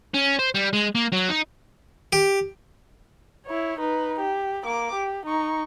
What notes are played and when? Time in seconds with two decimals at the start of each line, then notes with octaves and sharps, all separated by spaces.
0.14 C#4
0.39 C5
0.55 G3
0.73 G#3
0.95 A#3
1.12 F#3
1.30 D#4
2.13 G4
3.46 E4 C#5
3.79 D#4 B4
4.20 G4
4.65 A#3 D6
4.94 G4
5.26 D#4 C#6